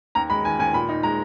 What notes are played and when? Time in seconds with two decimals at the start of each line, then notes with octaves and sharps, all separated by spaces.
0.15 D#2 A#5
0.30 G#3 B5
0.44 D#3 G#5
0.59 D#2 G#5
0.74 A#2 B5
0.89 D#4
1.03 G#3 A#5